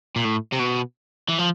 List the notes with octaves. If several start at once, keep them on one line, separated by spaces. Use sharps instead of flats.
A#2
A2
C3
B2
E3
F3